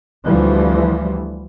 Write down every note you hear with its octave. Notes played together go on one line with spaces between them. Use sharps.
D2 E3 F3 G3